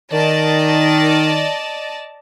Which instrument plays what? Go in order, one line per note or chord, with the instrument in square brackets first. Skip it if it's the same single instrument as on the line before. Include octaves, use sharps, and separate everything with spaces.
[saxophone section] D#3 [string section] D5 D#5 A5